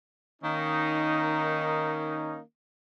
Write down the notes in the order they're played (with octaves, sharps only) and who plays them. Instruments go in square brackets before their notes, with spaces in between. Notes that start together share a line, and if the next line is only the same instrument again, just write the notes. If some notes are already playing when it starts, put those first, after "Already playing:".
[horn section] D#3 A#3 C#4 D#4